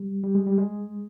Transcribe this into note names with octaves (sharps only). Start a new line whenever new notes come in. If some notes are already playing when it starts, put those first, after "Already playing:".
Already playing: G3
G3
G#3
G3
G#3